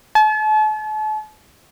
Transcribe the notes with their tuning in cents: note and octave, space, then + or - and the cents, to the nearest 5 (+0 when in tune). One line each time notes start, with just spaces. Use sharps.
A5 -40